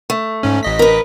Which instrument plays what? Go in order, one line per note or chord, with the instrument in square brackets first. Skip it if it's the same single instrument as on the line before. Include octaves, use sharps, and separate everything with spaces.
[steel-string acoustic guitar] A3
[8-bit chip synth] G#2 C#4
A1 D#5 B6
[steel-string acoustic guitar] A#4 B4